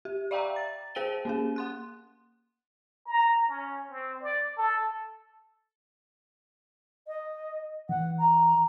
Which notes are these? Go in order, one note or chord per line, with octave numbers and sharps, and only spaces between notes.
G4
D5 E5 F5 G5 A#5 D6
A6
G#4 C5 G5 D7 D#7 G7
A#3 C#4 G#4
F#5 C6 F#6
A#5
C#4
C4
D5
A4
D#5
E3 F#5
A#5